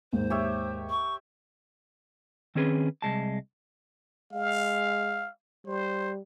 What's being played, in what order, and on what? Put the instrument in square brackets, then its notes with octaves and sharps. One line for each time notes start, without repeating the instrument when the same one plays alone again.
[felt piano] D#2 G#2 [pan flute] C5
[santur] G4 C#5 E5
[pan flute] C#6
[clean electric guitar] D#3 C4 C#4 G#4 B4
C2 G#3 A5
[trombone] G#3 [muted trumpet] F5
[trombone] G3 [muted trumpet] C5